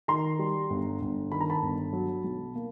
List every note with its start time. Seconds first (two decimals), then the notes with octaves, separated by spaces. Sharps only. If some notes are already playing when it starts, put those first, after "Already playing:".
0.08 D#3 A#5 C6
0.39 G3
0.70 G1
1.01 G1
1.32 D#3 B5
1.41 A#5
1.50 A5 B5
1.62 G1
1.93 F#3
2.24 B1
2.55 A#3